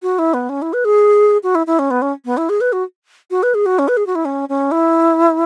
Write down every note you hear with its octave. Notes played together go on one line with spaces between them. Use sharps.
F#4
E4
B3
C#4
E4
B4
G#4
F#4
E4
E4
C#4
B3
C#4
B3
E4
G#4
B4
F#4
F#4
B4
G#4
F#4
C#4
B4
G#4
F#4
E4
C#4
C#4
E4